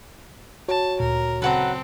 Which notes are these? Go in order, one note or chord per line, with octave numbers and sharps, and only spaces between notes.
F#4 C#5 A5
D2 A#2 A#4
C#3 F#3 C4 A4 B4 F#5 A#5